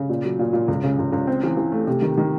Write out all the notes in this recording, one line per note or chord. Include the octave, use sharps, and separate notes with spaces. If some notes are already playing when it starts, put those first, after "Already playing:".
Already playing: C#3
A#2
F#3
A#2
A#2
C#2
C#3
C#2
C#2
C4
E3
E3
A3
C3
D#3
D#3